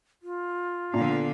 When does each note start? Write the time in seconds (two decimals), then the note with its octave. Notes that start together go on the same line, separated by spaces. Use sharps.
0.22 F4
0.94 A#2 D3 B3 F5